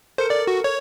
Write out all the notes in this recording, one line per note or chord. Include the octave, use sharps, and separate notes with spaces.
A4 A#4 C5 C#7
D5
F#4
C#5